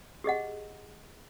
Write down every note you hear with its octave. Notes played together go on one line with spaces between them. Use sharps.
G4 G#4 D#5 F#5